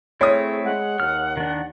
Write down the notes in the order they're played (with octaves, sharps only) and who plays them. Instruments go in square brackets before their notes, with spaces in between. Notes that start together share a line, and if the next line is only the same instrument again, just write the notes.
[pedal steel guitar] A3 C4 E4 [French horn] G#4 [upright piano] C#5 D#6
[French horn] G#3 [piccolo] F#5
[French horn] D#2 [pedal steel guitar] F6
[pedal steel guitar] D#3 D4